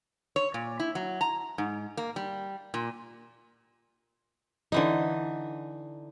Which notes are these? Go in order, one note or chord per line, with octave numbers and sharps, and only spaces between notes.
C#5
A#2
E4
F#3
A#5
G#2
A#3
G3
A#2
D3 E3 D#4